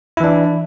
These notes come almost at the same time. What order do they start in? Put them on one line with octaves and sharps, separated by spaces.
E4 E3 D4